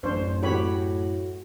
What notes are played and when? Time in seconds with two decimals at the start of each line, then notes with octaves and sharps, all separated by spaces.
0.03 A1 F#2 D4 C5 C#5
0.43 A2 F#4 G4 C#5 B5